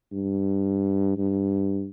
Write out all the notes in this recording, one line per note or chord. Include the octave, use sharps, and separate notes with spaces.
G2
G2